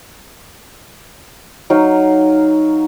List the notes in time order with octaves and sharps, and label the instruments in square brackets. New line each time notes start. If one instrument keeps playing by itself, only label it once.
[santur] F#3 D#4 F5